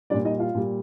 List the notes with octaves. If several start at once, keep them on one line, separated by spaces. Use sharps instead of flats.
A#2 G3 D4 D5
D#4 D#5
F4 F5
A#2 G3